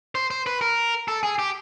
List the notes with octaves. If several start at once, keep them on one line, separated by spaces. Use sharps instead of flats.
C5
C5
B4
A#4
A4
G#4
G4